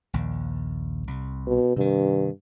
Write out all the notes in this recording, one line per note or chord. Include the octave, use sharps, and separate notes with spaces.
A#1 D#2
C2
B2
G2 C3 D#3